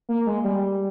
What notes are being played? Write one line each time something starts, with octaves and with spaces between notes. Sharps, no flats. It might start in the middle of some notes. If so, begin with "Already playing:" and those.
A#3
G#3
G3